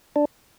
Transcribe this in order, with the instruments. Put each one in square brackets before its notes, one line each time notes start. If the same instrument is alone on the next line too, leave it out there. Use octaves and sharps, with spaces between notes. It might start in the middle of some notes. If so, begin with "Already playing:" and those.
[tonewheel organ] D4